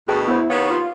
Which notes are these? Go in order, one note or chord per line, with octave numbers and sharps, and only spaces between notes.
D2 B2 G#4 G5 A5
B3 E4 C5
C3 D#3 B3 C#5 F5
F4